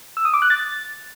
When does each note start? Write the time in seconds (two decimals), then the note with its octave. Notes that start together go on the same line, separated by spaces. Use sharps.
0.17 E6
0.25 D#6
0.34 D6
0.42 F#6
0.50 A6